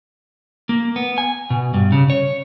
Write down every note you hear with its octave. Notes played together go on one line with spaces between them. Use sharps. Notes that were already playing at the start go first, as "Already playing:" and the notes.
A#3
B3
G#5
B2
G2
C#3
C#5